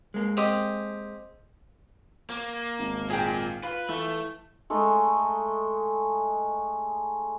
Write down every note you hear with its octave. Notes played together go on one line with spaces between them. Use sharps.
G#3 A#3
C4 G4 D#5
A#3
G#1
A#2 G#4 G5
F4 B4
E3 A3
G#3 A3 D#4